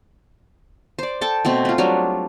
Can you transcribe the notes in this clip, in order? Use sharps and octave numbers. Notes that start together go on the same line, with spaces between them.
C5 D5
A4 G5 A5
B2 A3 C4
A3 F4
F#3 G3 D4 F4